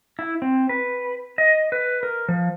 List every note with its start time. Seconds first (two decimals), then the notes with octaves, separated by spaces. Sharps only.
0.19 E4
0.42 C4
0.69 B4
1.38 D#5
1.72 B4
2.03 A#4
2.29 F3